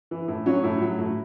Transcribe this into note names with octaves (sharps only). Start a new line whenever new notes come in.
E3
A2
F#3 C#4
A2
F#3
A2